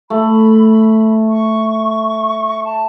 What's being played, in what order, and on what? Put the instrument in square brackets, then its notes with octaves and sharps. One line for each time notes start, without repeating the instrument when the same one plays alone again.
[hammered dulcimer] A3 [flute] B5
[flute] C#6
A5